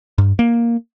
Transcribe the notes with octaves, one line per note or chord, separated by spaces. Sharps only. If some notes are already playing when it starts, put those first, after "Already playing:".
G2
A#3